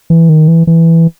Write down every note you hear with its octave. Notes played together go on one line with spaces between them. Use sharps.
E3
D#3
E3
E3